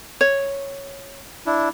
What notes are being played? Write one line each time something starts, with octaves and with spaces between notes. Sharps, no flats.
C#5
D4 E4